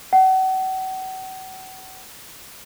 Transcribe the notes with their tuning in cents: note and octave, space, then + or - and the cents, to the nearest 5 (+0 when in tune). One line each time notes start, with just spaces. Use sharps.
F#5 +35